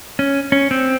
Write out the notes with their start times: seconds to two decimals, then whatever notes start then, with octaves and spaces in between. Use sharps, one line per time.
0.19 C#4
0.52 C#4
0.71 C4